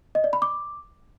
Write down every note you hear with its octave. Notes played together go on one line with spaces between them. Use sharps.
D#5
D5
B5
D6